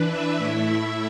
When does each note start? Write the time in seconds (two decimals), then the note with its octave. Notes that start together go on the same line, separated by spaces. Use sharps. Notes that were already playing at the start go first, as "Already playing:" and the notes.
Already playing: E3 D4 B4
0.09 E5
0.39 A2 A3 E4